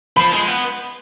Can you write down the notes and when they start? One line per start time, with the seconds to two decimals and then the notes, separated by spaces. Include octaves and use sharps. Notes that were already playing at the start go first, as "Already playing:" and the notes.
0.17 F3 B5
0.32 G#3
0.48 B3